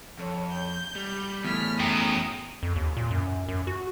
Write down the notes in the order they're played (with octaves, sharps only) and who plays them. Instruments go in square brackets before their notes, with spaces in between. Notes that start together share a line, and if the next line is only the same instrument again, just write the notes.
[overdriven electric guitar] F2 [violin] C#5
[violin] G6
[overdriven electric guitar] G3
[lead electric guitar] E2 A2 [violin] F6 B6
[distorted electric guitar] F#2 [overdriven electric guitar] G5 [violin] A#5 D#6
[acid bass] F2
D#2
A#2
F#2
F#2
F#4